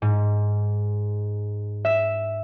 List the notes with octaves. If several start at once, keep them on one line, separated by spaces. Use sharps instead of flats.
G#2
E5